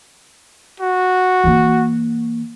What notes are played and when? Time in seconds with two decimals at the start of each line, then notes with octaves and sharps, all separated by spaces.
0.80 F#4
1.44 E3 A#3